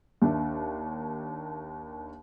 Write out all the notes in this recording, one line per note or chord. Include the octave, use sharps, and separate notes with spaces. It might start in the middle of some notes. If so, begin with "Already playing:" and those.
D#2 D4 E5